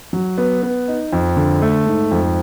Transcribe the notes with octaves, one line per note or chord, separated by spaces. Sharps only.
F#3
B3
B3
D#4
F2
D3
A3
G#2
F2